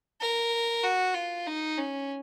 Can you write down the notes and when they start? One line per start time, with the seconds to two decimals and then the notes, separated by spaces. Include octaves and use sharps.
0.21 A#4
0.84 F#4
1.15 F4
1.47 D#4
1.78 C#4